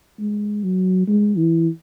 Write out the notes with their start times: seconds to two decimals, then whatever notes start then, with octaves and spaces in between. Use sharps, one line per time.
0.19 G#3
0.63 F#3
1.08 G#3
1.37 E3